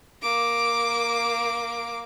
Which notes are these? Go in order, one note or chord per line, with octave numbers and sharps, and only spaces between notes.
A#3 D6